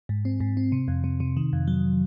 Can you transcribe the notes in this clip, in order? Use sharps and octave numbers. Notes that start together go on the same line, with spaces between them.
G#2
C4
G#2
C4
C3
F2
C3
C3
D#3
F2
F#3